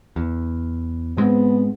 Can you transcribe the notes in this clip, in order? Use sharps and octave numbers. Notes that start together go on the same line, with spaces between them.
E2
G#2 G#3 B3 C4